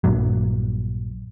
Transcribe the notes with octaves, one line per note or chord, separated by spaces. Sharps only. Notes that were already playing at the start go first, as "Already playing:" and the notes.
A#1 G2 A#2 F#3